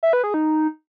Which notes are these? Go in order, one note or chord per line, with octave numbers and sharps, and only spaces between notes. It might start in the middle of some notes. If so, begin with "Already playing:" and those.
E5
B4
G#4
D#4